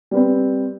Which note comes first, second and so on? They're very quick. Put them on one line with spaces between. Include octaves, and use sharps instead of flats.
G3 B4 C4